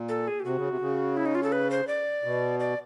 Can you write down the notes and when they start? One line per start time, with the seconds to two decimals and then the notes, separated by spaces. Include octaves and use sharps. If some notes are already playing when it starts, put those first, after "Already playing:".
Already playing: A#2
0.09 A4
0.28 G#4
0.40 G4
0.45 C3 F#4
0.57 C#3
0.69 C3
0.81 C#3
1.17 E4
1.26 D#4
1.35 F4
1.43 A4
1.52 B4
1.71 C5
1.87 D5
2.24 B2
2.60 D5